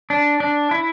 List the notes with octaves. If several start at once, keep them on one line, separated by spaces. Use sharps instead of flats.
D4
D4
E4